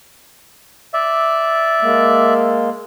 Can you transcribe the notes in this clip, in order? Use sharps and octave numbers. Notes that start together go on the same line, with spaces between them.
D5 E5
G#3 A#3